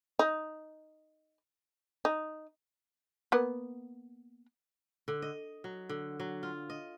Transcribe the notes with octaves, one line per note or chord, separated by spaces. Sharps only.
D#4
D#4
A#3 B3
D3
D#5
F#3
D3
F#3
F4
D#5